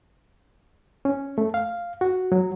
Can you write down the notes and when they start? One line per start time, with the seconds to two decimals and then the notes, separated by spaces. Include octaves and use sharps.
1.05 C#4
1.38 A3
1.54 F5
2.01 F#4
2.32 F#3